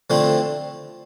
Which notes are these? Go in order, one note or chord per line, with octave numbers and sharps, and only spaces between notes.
D3 F3 A3 C4 E4